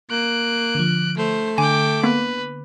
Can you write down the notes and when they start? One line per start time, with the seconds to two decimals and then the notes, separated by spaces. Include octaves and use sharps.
0.11 A#3 F#6 D7
0.75 D3 F3
1.18 A3 C5
1.58 D3 G5 G#5 D6
2.04 A#3 B3 B4